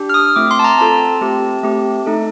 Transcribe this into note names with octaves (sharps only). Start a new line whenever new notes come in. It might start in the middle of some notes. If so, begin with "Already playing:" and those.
Already playing: D4 G4
F6
D#6
A3 C4 F4 D6
C6
A5
A#5
C4 F4 A4 A5
A3 C4 G4
A3 C4 G4
A3 D#4 A4